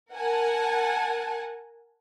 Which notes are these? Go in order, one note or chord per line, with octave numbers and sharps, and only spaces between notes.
A#4 F#5 G#5 A5